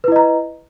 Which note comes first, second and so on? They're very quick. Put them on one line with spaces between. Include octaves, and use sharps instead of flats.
B4 E4 D#5 A#5